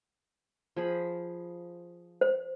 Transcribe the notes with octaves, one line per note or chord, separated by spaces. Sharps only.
F3 G#4 B5
C5